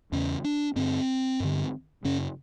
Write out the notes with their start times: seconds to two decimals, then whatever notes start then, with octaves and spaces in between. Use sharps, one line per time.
0.12 E2 C#3 C#4
0.44 D4
0.76 G2 D3 C4
1.40 G2 D3
2.04 F#2 C#3 C#4